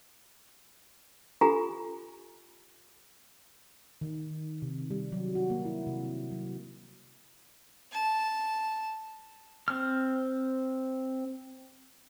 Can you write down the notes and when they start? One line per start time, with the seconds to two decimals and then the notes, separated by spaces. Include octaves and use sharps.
1.41 F4 G4 A4 G#5 A#5
4.01 D#3
4.62 C3
4.91 G3
5.12 F#3
5.35 F#4
5.50 A#3
5.65 E4
5.86 C3
6.31 F#3
7.92 A5
9.68 C4 F6